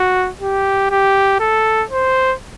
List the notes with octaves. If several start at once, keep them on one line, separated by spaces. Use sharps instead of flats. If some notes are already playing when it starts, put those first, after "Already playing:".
Already playing: F#4
G4
G4
A4
C5